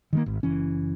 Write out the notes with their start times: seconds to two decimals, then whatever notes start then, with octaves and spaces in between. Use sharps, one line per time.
0.13 D#3 G3 A#3
0.26 G#1
0.43 F#1 E3 C#4